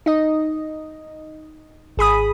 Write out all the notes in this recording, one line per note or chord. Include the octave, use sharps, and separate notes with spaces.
D#4 D#5
G#1 G#4 B5 D#6